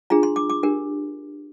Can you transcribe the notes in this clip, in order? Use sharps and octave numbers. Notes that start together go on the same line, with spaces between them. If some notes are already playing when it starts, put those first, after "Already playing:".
D4 F4 G#4 A#5
C6
D6
D6
D4 G4 A#4